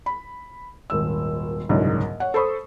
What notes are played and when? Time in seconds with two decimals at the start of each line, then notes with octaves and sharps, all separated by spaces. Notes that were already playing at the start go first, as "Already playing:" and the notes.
0.06 B5
0.90 D#1 G#1 E6
1.69 F#1 C2 G#2 D3 F#3
2.20 C#5 F#5
2.34 A4 C5 B5 C#6 D#6